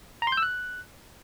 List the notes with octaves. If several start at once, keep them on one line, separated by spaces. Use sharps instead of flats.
A#5
C6
G6
E6
F#6